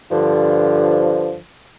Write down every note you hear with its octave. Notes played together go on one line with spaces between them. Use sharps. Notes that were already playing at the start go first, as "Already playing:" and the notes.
G2 D3 F3